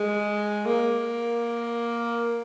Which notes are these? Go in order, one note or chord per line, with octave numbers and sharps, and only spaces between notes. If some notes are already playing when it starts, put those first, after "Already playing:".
Already playing: G#3
A#3